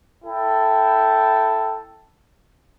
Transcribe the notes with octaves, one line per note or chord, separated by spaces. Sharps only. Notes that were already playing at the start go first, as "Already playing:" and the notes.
E4 A4 G5